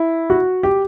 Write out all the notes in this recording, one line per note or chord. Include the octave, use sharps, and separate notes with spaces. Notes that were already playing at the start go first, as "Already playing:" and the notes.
Already playing: E4
F#4
G4